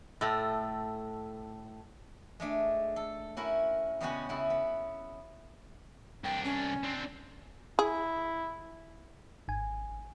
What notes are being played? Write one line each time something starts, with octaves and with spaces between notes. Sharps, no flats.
A2 A3
G#3 A3 D4
A4
C#4 E4 F#4 A#4
C#3 G3 G#3 B3 C#4 F#4
C#3 E4 F#4
B3
C2 D4 G5
C#4
C4 D4
E4 G#4
G#1 G#5